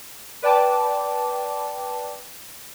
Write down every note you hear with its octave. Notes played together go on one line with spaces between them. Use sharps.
B4 D5 G5 A5 D6